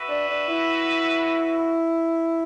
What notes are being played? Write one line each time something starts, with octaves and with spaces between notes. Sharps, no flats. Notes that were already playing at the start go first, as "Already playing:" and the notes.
Already playing: F#4 B4 E5
D4
D4
E4